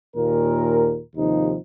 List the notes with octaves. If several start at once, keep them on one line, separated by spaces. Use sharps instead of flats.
D#2 A#2 A#4
D#2 C3 F3 D#4